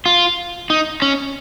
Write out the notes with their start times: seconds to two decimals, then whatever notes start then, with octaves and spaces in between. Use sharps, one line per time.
0.06 F4
0.70 D#4
1.02 C#4